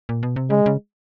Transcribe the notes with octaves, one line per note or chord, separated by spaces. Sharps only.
A#2
B2
C3
C#3 G#3
C#3